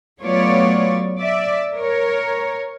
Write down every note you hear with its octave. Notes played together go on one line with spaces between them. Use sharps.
F#3 A3 B3 F4 C#5 D5
D5 E5
A#4 C#5